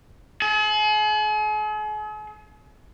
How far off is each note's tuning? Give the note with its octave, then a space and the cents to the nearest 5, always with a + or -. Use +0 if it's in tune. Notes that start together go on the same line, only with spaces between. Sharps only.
G#4 +40